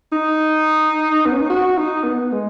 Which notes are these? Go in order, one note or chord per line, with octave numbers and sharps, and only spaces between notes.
D#4
B3
C#4
D#4
F#4
D#4
B3
G#3